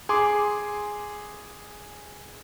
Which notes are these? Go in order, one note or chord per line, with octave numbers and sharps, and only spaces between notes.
G#4 C6 D6